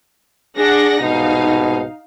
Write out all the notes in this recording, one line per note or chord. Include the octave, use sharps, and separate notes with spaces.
D4 G#4 F#5 A#6
C2 G#2 B2 D#4 F5